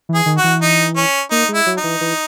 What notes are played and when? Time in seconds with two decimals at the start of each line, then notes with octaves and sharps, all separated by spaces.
0.09 E3
0.14 G#4
0.26 D#3
0.37 F#4
0.44 E3
0.62 D#4
0.96 C#4
1.31 A#3 D#4
1.49 G#3
1.54 E4
1.66 F#3
1.77 D#4
1.84 E3
2.01 E3